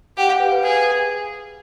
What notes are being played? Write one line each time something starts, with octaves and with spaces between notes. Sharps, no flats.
G4 F#5
F5
B4
B4
G#4